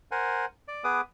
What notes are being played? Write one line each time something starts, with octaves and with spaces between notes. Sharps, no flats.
A#4 C5 F#5 G#5
D5
B3 G#4 B4 D6 D#6